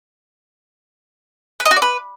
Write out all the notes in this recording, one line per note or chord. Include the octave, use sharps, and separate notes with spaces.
B4
D#5
F#4
D5
B4